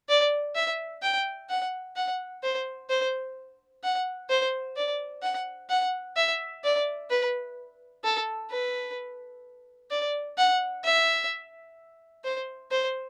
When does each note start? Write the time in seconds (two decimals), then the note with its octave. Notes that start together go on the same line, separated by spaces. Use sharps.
0.09 D5
0.55 E5
1.02 G5
1.49 F#5
1.96 F#5
2.43 C5
2.89 C5
3.83 F#5
4.30 C5
4.76 D5
5.23 F#5
5.70 F#5
6.16 E5
6.63 D5
7.10 B4
8.04 A4
8.51 B4
9.91 D5
10.37 F#5
10.84 E5
12.24 C5
12.71 C5